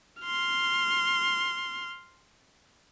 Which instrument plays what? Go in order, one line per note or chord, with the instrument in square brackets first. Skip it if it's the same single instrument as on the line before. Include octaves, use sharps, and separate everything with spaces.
[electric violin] C6 F6